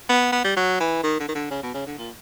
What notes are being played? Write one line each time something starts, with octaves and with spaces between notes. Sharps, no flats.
B3
B3
G3
F#3
E3
D#3
D3
D#3
D3
C#3
B2
C#3
D3
A#2